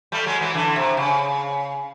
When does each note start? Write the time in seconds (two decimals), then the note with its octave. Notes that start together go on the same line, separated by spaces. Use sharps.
0.12 G3 A3
0.26 F#3 G#3
0.41 E3 F#3
0.54 D3 E3
0.76 C3
0.97 C#3